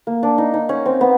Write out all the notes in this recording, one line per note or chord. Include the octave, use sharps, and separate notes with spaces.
A#3
D4
D#4
D#4
C#4
C4
B3